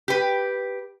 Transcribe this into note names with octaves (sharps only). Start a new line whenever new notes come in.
G4 B4